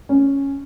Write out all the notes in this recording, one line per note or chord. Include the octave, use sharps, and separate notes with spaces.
C#4